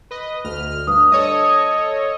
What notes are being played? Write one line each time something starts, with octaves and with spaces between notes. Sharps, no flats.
B4 D#5
D2 F6
G2 D#6
A4 C#5 D#5